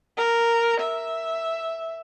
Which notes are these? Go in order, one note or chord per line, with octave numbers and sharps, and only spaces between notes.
A#4
E5